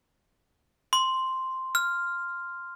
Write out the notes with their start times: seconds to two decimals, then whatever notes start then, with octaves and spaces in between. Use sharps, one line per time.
0.93 C6
1.75 F6